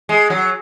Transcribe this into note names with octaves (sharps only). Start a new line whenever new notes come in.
G#3
F#3